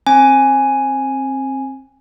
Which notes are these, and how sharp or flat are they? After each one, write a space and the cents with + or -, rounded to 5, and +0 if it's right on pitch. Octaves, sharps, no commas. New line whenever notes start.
C4 +25 G#5 +0